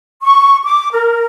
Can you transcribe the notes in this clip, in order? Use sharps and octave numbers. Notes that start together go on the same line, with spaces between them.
C#6
D6
A#4